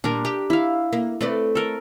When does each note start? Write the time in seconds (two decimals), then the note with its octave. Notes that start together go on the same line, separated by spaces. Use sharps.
0.04 A#2 G3 D4 A#4
0.25 G4
0.50 E4 F5
0.93 A#3
1.21 A3 C4 B4 D5
1.55 A4 A#4